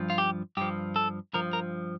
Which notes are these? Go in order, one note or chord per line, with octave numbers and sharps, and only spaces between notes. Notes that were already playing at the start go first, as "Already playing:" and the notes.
Already playing: G2 F3
F4
G4
G2 F3 G4
A4
G2 F3 A#4
A#4